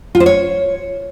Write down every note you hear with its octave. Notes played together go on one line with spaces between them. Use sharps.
F4
C5
C#5